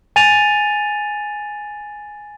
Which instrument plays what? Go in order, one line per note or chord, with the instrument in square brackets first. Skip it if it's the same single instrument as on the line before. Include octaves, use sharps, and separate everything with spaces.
[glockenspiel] G#5 A6 D#7 F7